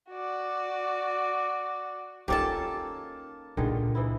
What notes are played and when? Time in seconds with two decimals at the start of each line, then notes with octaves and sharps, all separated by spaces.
0.10 F#4 D5
2.28 D#3 A#3 C#4 D#4 F4 G4 A4 A5
3.57 C#2 A#2 D3 D#3 G#4
3.95 E3 D#4 E4